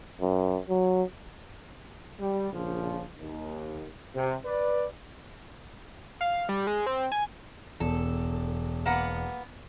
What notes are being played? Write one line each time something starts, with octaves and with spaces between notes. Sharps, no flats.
F#2
F#3
G3
A#1 C#3 F3
D#2
C3
B4 D5
F5
G3
G#3
C4
G#5
E1 A4
A#3 B3 F#5